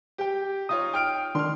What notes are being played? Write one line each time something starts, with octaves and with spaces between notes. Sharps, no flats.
G4 G5
D#4 F4 C#5 D#6
G5 F6 D7
D#3 D4 C6 F6